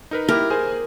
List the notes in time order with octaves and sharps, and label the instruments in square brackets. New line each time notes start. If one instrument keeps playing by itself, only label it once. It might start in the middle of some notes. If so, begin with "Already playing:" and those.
[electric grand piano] D#4 A#4 B4
[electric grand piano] A#3 E4 G4 [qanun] A#4
[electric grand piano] G#4 C5 G#5